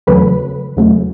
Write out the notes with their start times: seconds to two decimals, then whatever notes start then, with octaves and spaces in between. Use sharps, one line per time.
0.07 E2 C#3 F#3 A3 B4
0.77 E2 C#3 F#3 A3